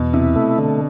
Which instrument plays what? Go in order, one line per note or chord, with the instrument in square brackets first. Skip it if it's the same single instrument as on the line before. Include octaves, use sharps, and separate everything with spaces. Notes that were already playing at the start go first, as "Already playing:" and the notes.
Already playing: [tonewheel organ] E2 [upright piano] B2
[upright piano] C3 [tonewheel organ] E4
[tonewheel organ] A3
D3